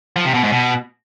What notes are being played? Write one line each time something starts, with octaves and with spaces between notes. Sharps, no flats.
F3
C3
B2
G#2
B2